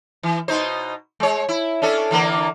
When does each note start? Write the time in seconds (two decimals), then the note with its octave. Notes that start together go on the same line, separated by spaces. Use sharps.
0.23 E3
0.48 B2 D#4 C5
1.20 G#3 C#5
1.49 E4
1.82 C#4 D4 A4
2.11 D3 E3 A#3